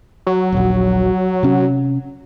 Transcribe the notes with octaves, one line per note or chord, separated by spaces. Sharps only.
F#3
D#1 A#1
C3 C#4